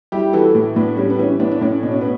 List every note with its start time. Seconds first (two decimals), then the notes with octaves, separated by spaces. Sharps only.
0.12 G3 E4 G4
0.33 E3 F#4 A4
0.55 A2
0.76 A2 B3 D4
0.97 G3 C#4
1.10 B3
1.19 E3 C#4
1.40 A2 B3 D4
1.52 D4
1.61 A2 C#4
1.83 B2 D4
1.92 C#4
2.01 B3